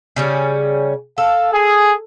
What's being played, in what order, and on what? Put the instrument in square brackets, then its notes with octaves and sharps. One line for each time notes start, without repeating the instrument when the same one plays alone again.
[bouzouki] C#3 G3 C#4
[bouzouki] A4 [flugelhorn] F5
[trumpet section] G#4 [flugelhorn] G#5